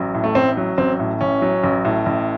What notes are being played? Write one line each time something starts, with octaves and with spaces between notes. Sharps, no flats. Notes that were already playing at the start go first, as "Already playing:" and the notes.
Already playing: A1 F#3
A2
A3
A1 C4
F#3
A1 C4
A2
A1 C#4
F#3
A1
A2
A1